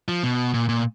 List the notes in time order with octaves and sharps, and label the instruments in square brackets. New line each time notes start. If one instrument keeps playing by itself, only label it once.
[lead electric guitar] F3
B2
A#2
A#2